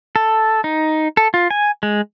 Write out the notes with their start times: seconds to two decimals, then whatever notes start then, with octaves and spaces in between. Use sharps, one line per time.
0.16 A4
0.64 D#4
1.17 A4
1.34 F4
1.51 G#5
1.83 G#3